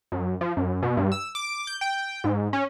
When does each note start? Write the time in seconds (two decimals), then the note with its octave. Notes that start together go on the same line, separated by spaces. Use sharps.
0.12 F#2
0.41 F3
0.57 F#2
0.83 B2
0.97 G2
1.12 E6
1.35 D6
1.67 G6
1.81 G5
2.24 G#2
2.53 C#4